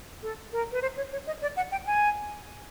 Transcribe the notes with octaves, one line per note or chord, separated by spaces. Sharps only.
A4
A#4
B4
C5
C#5
C#5
D#5
D5
F#5
G5
G#5